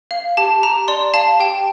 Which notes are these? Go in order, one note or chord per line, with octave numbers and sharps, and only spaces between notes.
F5
G4 A5
G4 A#5
D5 C6
F5 A5
G4 G5